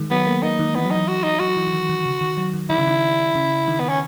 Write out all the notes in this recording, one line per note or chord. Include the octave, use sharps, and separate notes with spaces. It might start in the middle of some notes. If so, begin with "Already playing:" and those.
Already playing: D#3 G#3
F#3 B3
A#3
A#3 D#4
D#3
E3 B3
F#3
E3 D#4
F#4
D#4
F#3 F#4
E3
E3
D#3
D#3
C#3
D#3
F#3
D#3
D#3 E4
C#3
D#3
C#3
D#3
B3
C#4